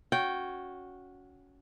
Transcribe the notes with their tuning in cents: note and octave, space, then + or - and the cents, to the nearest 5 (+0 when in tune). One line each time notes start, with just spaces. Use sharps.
C#4 +20 F#4 -10 G5 -10